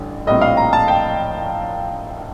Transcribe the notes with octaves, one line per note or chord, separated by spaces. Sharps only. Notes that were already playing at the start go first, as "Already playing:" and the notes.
Already playing: A1 G2 D3
A#1 A2 G3 C4 D#5
F5
A#5
A5
G5